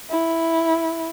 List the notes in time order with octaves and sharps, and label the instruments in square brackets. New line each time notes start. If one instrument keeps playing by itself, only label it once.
[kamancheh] E4